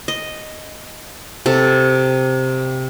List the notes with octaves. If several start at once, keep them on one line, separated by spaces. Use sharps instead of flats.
D#5
C3 A4